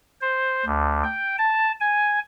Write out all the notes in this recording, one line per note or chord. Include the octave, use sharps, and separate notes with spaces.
C5
D2
G5
A5
G#5